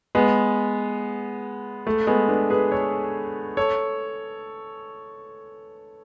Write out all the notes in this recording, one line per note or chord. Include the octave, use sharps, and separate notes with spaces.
G#3 B3
A3
G#3 B3
B3 D4
G#4 B4
A4 C#5
A4 C#5